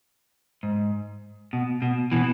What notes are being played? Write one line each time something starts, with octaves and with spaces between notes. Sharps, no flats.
G#2
B2
B2
B2 E3